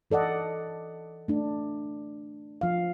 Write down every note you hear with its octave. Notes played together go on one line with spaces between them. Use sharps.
E3 A4 D5 D#5 F#5
A3 D4
F3 F5